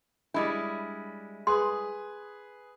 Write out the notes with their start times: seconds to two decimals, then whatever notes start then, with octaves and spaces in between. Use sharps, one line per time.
0.34 G3 G#3 D4 E4
1.47 G#4 B4 C6